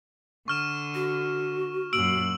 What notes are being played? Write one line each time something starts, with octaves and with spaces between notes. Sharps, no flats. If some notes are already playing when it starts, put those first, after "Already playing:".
D3 C#6 F6 E7
F#4
F#2 A#2 E6 D7 F#7